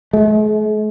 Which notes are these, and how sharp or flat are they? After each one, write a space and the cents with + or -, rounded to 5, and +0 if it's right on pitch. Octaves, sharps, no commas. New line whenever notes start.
G#3 +45